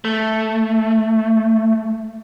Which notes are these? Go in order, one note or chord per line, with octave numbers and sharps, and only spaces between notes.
A3